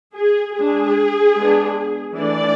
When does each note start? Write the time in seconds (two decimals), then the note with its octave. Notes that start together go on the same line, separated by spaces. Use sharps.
0.17 G#4
0.57 G#3 D4 G#4
1.37 G#3 B3 D4
2.17 E3 A3 D4 D5